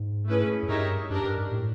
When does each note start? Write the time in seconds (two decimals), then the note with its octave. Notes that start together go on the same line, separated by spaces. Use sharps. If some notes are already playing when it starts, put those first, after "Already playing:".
Already playing: G#2
0.27 A3 C#4 E4 G#4 B4
0.63 F#2
0.68 G2 D#4 G4 A#4 C#5 E5
1.10 F#2 D4 G4 A#4
1.24 G2
1.38 G#2
1.52 A2